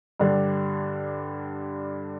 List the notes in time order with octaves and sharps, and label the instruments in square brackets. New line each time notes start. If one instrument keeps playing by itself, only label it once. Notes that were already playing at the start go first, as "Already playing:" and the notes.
[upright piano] G2 D3 G3 D4